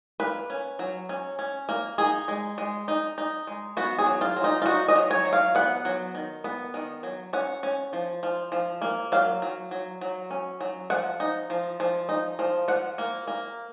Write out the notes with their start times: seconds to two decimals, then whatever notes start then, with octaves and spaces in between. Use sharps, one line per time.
0.20 A#3 B4
0.50 C#4
0.79 F#3
1.09 C#4
1.39 C#4
1.69 A#3
1.98 D#4 G#4
2.28 G#3
2.58 G#3
2.88 D#4
3.18 D#4
3.47 G#3
3.77 B3 F#4
3.99 G#4
4.06 F#3
4.21 F4
4.36 F#3
4.44 D#4
4.62 F4
4.66 D#4 F#4
4.89 D#5
4.96 F#3
5.11 C#5
5.25 F#3
5.33 F5
5.55 B3 F#5
5.85 F#3
6.15 D#3
6.44 B3
6.74 D#3
7.03 F#3
7.33 C#4 F#5
7.63 C#4
7.93 F3
8.23 F3
8.52 F3
8.82 A#3
9.12 F#3 F5
9.42 F#3
9.71 F#3
10.01 F#3
10.31 C#4
10.61 F#3
10.90 F3 F#5
11.20 D#4
11.50 F3
11.80 F3
12.09 D#4
12.39 F3
12.68 F3 F#5
12.98 A#3
13.28 A#3